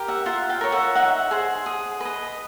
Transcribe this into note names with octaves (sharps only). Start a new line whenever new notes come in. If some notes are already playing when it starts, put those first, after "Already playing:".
Already playing: G4 A#4
E5 F#5
F4 E5 F#5
F5 G5
A#4 C#5
E5 F#5
D#4 E5 F#5
G#4 C5
G#4
B4 D#5